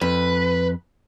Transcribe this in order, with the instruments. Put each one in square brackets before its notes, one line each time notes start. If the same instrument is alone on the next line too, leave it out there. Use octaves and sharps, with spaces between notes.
[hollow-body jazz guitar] F2 [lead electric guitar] B4